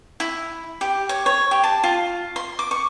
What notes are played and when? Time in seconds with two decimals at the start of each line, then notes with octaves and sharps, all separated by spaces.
0.20 E4
0.81 G4
1.09 C#5
1.26 C#5
1.51 G4
1.63 A5
1.84 F4
2.36 C6
2.59 D6
2.71 C#6